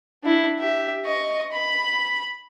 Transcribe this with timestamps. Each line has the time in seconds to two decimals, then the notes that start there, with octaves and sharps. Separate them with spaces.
0.23 D4 E4
0.60 G4 E5
1.05 D#5 C#6
1.52 B5